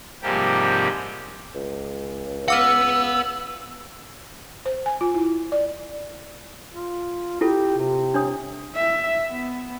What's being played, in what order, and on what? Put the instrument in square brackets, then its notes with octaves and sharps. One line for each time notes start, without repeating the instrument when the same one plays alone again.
[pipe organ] G#2 C3 F3 G3 A#3 G4
[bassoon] C#2
[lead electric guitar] B4 F#5 [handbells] F5 D6 F6 [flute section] E6
[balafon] C5
G#5
F4
E4
D5
[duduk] F4
[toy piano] E4 F4 A4 [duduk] G4
[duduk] C3
[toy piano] D4 C#5 D#6
[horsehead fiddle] E5
B3